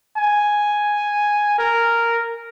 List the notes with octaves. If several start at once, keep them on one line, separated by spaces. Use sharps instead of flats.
G#5
A#4